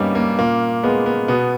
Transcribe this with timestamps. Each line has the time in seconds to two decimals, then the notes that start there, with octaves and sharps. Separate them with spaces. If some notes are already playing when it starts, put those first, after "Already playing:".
Already playing: G2 G3 A#3 B3 C#4 D#4
0.15 A#3
0.39 A#2 A#3
0.83 G#3 B3
1.06 B3
1.28 B2 B3